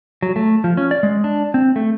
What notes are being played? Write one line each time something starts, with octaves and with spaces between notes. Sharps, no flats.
F#3
A3
F3
C#4
D5
G#3
D4
C4
A3